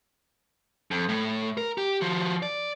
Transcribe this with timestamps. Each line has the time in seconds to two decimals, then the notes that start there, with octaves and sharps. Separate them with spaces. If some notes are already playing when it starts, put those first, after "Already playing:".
0.91 F2
1.09 A2
1.57 A#4
1.78 G4
2.01 F3 F#4
2.43 D5